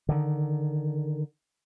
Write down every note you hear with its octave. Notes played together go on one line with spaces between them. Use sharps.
D3 D#3